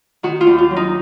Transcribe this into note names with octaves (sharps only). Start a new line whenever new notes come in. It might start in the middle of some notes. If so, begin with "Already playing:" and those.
D#3 F#4
F4
D#2
F4
F#3
D#4